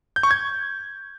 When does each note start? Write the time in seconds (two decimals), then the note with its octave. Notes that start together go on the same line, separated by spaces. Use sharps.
0.16 G6
0.23 C#6
0.31 G#6